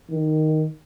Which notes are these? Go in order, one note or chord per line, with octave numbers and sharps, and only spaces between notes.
D#3